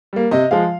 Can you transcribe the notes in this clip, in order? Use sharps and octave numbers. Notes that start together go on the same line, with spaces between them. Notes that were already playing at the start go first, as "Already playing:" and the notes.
G3 A#3
C3 D#5
F3 G#3 F5